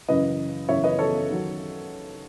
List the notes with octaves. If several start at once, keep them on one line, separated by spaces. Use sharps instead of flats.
F#2 C#3 E3 B4 D#5
F#2 C#3 E3 C#5 E5
B4 D#5
A4 C#5
D#3 F#3